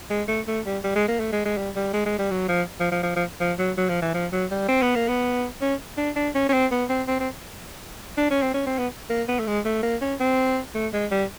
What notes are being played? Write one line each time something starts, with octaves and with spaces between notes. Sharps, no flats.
G#3
A3
A3
G3
G3
G#3
A#3
A3
G#3
G#3
G3
G3
G#3
G#3
G3
F#3
F3
F3
F3
F3
F3
F3
F#3
F#3
F3
E3
F3
F#3
G3
C4
B3
A#3
B3
C#4
D4
D4
C#4
C#4
C4
B3
C4
C4
C4
D4
C#4
C4
C#4
C4
B3
A#3
B3
A3
G#3
A3
A#3
C#4
C4
A3
G#3
G3